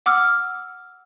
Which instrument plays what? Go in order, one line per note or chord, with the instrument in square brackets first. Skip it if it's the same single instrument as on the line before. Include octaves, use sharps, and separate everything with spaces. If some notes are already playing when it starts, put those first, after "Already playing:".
[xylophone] F#5 D6 E6 F6